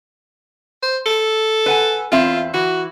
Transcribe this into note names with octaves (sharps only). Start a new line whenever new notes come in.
C5
A4
B4 F#5 G#5
E2 C4 F4 E5
E3 F#4